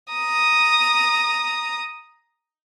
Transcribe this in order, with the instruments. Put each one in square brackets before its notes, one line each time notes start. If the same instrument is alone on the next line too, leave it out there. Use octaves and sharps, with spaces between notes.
[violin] A#5 D#6